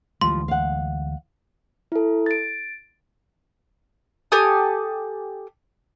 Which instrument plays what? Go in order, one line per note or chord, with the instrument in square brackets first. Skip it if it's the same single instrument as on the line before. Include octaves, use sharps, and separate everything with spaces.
[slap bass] D2 E3 G#3 [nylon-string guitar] F3 G3 [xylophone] C6
[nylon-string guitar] F5 F#5
[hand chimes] E4 A4
A6 D7
[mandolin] G4 A4 G#5 D#6